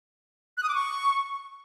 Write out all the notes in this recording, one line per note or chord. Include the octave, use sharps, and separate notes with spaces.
F#6
D#6
D6
C#6